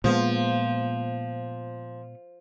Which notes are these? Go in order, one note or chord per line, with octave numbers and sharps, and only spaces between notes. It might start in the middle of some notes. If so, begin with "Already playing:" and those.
A#2 F3 G#3 B3